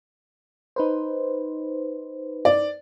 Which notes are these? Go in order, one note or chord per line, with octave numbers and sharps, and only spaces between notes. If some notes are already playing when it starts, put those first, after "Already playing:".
D#4 B4 C5
D5